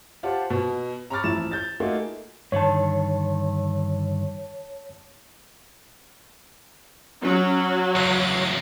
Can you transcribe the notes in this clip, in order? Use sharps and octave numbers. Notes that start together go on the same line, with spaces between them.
F4 G4 C5 F#5 A5
B2
A#5 B5 C#6 D6 F6 A6
A1 F2 E4 E7
G6 A6
A3 A#3 D#4 F4 F#4 G#4
G2 D3 D#3 C#5 A5
F#3 C#4
E2 C#3 A#6